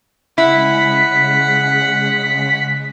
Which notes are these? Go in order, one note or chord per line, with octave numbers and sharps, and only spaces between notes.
C#3 G#3 E4 F#5 B6